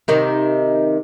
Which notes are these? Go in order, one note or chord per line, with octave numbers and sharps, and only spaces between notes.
C3 D#3 D#4